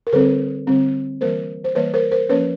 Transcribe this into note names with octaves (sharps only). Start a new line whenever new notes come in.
A#4
D3 G3 C4 A4 B4
D3 G3 C4
E3 G3 A#3 A#4 C5
C5
E3 G3 A#3 B4 C#5
A#4 C5
A#4 C5
F3 A#3 C#4 B4 C#5